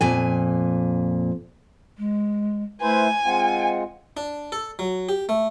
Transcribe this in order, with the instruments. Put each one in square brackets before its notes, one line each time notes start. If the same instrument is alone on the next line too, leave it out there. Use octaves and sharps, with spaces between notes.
[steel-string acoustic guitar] F2 A#2 G#5
[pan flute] G#3
[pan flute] A3 [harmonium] E4 B4 C5 [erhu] G#5
[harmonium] G#3 C4 F4 [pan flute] F#5
[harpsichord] D4
A4
F#3
G4
A3